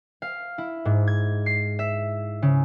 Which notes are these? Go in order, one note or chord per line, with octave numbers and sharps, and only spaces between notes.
F5
E4
G#2
G#6
C7
E5
C#3